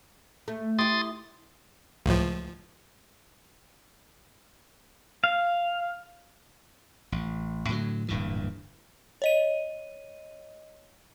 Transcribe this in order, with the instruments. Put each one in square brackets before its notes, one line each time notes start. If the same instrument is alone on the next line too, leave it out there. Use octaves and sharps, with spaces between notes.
[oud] A3
[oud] E4 G4 [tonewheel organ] C6 D#6 A6
[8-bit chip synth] C#2 A2 F3
[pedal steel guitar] F5
[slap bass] A1
A2 D3 F3 F#3
D1 G2 A#2 E3
[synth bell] C#5 D#5 D#7